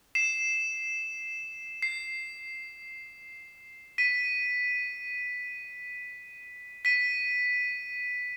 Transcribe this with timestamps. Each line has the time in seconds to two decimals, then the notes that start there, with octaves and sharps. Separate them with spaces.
0.15 C7 E7
1.82 C7
3.98 B6 D#7
6.85 B6 D#7